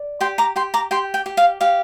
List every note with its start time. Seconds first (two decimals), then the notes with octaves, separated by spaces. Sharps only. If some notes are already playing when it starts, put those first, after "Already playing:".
Already playing: D5
0.21 G4 G5 C6
0.38 A#5 D6
0.56 G4 G5 C6
0.74 A#5 D6
0.91 G4 G5 C6
1.14 G5
1.26 G4
1.37 F5
1.61 G4 F5